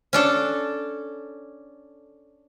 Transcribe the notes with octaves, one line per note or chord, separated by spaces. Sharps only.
C#4 D4 A4